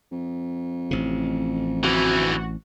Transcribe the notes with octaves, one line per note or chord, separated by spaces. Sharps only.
F2
A1 C3
D2 E3 F#4